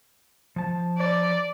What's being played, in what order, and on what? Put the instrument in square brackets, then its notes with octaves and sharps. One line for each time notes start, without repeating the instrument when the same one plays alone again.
[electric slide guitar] F3 A5
[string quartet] D5